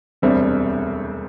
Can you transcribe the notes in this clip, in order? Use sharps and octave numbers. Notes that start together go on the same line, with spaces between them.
E1 D2 C3 G3 C4